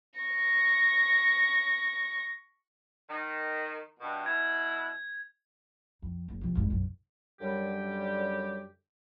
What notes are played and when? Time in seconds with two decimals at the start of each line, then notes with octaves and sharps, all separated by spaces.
0.20 C#6 A#6
3.10 D#3
4.00 G2 B2
4.26 B2 E4 G#6
6.02 F2
6.28 F#1
6.41 C3 F3
6.55 G#1 G2
6.70 B1 F#2
7.41 F#2 D3 G3 G4